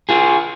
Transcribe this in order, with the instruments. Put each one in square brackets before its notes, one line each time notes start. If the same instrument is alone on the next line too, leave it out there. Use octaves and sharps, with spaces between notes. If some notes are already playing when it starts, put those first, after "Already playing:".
[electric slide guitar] F4 G#4